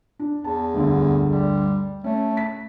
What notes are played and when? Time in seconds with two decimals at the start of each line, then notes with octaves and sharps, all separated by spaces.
0.19 D4
0.44 E2 A5
0.74 D2 G2 D3
1.30 G3
2.04 A3 C#4
2.37 B6